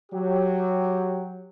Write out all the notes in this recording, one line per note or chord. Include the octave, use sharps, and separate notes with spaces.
F#3 G4